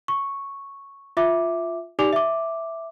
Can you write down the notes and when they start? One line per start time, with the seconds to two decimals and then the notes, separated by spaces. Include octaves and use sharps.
0.08 C#6
1.17 F4 E5 D6
1.99 D#4 G4 D5 G#5 D6 F7
2.13 E5 D6